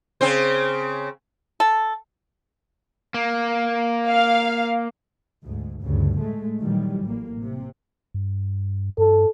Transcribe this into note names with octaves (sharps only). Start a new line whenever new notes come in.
C#3 C4 C5
A4
A#3
F5
D2 G#2
D2 G2 C#3
A2 G#3 A3
A#2 D#3 E3 F#3 G3
A1 A2 A#3
C3
G2
G2 A4